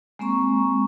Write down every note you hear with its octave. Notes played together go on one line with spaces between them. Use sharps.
G#3 A#3 C4 A#5 C#6